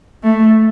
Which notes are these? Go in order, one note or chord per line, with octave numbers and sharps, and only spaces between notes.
A3